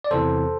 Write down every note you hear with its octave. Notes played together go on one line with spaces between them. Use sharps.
D5
E2 C3 E3 A4 C5